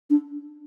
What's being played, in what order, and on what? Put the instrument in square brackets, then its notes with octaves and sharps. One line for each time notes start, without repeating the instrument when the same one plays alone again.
[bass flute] D4